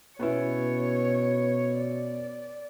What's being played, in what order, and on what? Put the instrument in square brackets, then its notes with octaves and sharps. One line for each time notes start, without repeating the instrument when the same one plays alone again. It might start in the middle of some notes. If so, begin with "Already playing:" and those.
[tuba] B2 [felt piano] B3 C#4 E4 [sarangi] C#5
[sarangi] D5